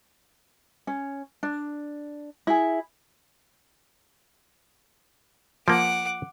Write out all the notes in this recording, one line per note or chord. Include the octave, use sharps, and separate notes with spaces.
C#4
D4
E4 G#4
F3 A#3 F#5 D6